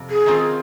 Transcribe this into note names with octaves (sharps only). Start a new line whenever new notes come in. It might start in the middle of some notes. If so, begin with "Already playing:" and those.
Already playing: F2 C3
G#4
D#3 C4 F4